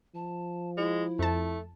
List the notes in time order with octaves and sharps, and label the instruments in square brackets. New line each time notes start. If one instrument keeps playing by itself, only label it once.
[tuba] F3 [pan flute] A5
[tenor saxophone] G#3 [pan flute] E4
[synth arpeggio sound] F2 A5 [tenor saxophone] A3